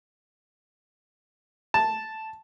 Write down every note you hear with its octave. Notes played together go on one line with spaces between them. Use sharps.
A5